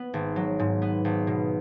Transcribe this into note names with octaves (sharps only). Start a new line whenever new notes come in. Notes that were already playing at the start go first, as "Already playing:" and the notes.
Already playing: B3
G#1
F#3
G#2
B3
G#1
B2